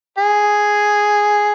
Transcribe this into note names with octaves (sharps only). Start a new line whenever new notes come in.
G#4